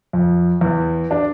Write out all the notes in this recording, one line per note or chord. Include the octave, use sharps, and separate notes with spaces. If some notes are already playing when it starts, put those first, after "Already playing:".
F2
E2
D4